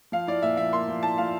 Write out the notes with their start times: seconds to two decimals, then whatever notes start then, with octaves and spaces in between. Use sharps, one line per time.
0.12 F3 F5
0.27 E4 D5
0.42 A#2 E5
0.57 F3 E5
0.73 A#3 C6
0.88 F3
1.03 E4 A5
1.18 F3 F5